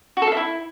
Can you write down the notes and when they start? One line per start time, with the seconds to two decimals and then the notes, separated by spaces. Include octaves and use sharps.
0.17 F#4
0.22 A4
0.27 F5
0.32 E5
0.37 E4